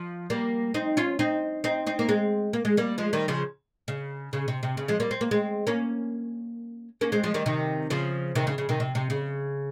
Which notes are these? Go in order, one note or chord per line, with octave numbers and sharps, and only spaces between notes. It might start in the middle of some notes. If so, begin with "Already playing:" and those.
Already playing: F3
G3 A#3
C4 D#4
C#4 F4
C4 D#4
C4 D#4
C4 D#4
A#3
G#3 C4
A#3
G#3
G3 A#3
F3 G#3
D#3 G3
C#3 F3
C#3
C#3
C3
C3
C#3
F3 G#3
G3 A#3
C4
A#3
G#3 C4
A#3 C#4
A#3 C#4
G#3 C4
F3 G#3
D#3 G3
C3 D#3
C#3 F3
C3 D#3
C#3
C#3
C3 D#3
C3
C3
C#3